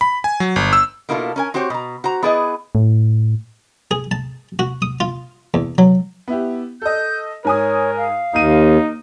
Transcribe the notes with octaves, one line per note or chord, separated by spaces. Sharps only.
B5
G#5
F#3
G1
E6
B2 A#3 E4 F4 G4 A4
C#4 A#4 G#5
C4 F#4 G4 C5 C#5
B2 A#5
F#4 C5 A#5
B3 E4 G#4 B4 D5 D#5
A2
G#4
A5
F#4
D#6
F4
E2
F#3
B3 E4 G4
A4 D#5 G6
G#2 A#4 C#5 G#5 D#6
F5
D#2 A#3 D#4 D#7